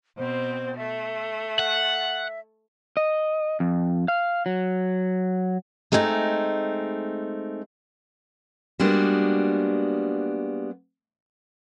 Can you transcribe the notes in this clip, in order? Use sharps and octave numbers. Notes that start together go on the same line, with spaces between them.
B2 C4 C5
A3 E5
F#5
D#5
F2
F5
F#3
G#3 A3 C4 C#4 D#4
G3 G#3 A#3 B3 D4 F#4